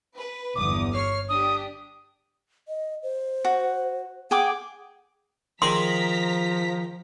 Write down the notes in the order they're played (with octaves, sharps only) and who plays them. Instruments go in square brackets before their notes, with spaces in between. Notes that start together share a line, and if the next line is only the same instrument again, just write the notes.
[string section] B4
[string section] G1 E2 D#6 [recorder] D6
[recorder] C#5 [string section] F6 C7
[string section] D4 G4 [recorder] D#6
[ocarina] D#5
C5
[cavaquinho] F#4
[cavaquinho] G#4 G5 D6 [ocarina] F#5
[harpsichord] D#3 D#4 G#4 [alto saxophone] F3 [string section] A#5 B6 [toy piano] C6